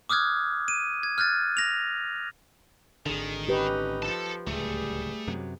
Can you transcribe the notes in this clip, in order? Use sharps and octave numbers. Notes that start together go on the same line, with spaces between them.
D6 D#6 F6 F#6 G#6
D#7
G#6
F6 F#6 G#6 A6
A#6 F7
G#1 D3 D#3 G#4
C#4 D#4 G4 B4
F3 A4 A5
D1 C#2 G3 A3 G#4
F#2 C3 F#3